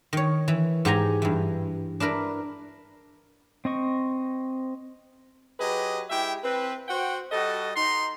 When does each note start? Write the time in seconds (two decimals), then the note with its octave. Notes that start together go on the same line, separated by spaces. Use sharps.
0.13 D#3 C#5
0.48 E3
0.85 G#2 G4 G#5 A#5
1.22 G2 E3
2.00 D4 E4 A#4 B4
3.65 C4 D#5 C#6
5.60 F#3 G4 G#4 B4 D#5
6.10 G#3 E4 G4 E5 G5
6.43 C4 B4
6.88 F#4 C5 F#5 G5
7.32 G3 F#4 A4 D#5
7.76 D#4 C6